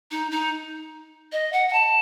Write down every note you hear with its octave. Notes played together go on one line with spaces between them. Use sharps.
D#4
D#4
D#5
F#5
F#5
A5